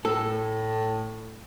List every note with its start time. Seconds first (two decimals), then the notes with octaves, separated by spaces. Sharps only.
0.05 A2 A4